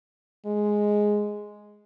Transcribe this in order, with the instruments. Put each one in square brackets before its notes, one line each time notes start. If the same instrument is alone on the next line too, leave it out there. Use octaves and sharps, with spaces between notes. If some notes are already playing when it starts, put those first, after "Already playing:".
[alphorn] G#3